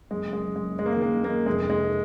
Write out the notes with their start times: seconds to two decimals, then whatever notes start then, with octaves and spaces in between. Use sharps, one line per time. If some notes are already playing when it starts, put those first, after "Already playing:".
0.11 F#1 G#3
0.28 F#1 G#3
0.45 F#1
0.56 G#3
0.62 F#1
0.78 F#1 G#3
0.86 A#3
0.93 D#3 G#3
1.02 A#3
1.12 F#1
1.24 A#3
1.29 D#3
1.46 F1 G#3
1.64 F1
1.70 G#3